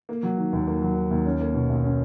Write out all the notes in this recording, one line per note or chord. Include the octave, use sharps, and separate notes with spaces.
A#3
F#3
D#3
D#2
A#3
F#3
D#3
D#2
C#4
A#3
B2
B1
C#4